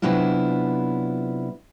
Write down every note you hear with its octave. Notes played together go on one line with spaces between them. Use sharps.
C3 F#3 B3 D4 E4 F4